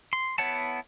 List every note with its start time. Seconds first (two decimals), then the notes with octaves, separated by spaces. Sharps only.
0.13 C6
0.38 B3 E4 C#5 F#5 A5